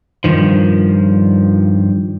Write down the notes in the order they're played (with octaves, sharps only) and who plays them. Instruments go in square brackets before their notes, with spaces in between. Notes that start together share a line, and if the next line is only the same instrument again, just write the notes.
[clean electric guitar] G2 D#3 F3